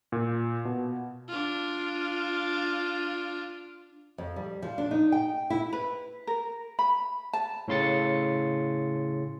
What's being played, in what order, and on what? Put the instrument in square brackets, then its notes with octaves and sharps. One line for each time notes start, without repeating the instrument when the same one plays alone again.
[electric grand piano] A#2
B2
[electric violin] D4 F4
[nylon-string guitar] F2
G3
F3
D4
D#4
G5
E4
[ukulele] B4
A#4
B5
A5
[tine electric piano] A2 C#3 C6 A6 C#7